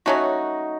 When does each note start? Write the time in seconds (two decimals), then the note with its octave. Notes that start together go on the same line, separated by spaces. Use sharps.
0.06 F#3 A3 C#4 D#4 F#4